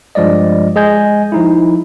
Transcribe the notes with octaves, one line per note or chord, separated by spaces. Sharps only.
G2 F3 G#3 D5 D#5
G#3 G#4 D#5 G#5 G6
F3 D#4 E4